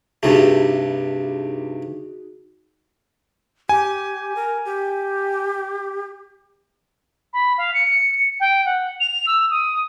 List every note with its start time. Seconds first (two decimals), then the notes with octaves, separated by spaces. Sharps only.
0.23 G2 C3 A3 D#4 F#4 G#4
3.69 G4 G#5
4.36 A#4
4.65 G4
7.33 B5
7.58 F5
7.74 C#7
8.40 G5
8.65 F#5
9.00 F7
9.26 E6
9.50 D#6